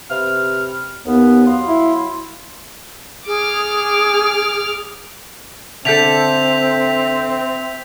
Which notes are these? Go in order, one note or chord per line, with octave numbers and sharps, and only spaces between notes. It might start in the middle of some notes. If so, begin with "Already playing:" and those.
C3 B4 F6
D#2 B3
F#3 F5 C6
E4
G#4 D6 F6
D3 C4 A4 E5 G6 B6 F7